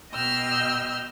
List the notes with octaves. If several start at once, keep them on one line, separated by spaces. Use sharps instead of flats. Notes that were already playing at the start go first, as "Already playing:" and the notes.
B2 D#5 G5 E6 F6